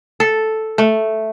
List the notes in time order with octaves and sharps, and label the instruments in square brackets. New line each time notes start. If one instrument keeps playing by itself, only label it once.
[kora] A4
A3